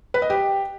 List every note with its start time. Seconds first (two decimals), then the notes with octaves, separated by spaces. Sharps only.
0.14 B4
0.22 D#5
0.30 G4